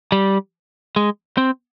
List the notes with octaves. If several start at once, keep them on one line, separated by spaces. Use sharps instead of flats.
G3
G#3
C4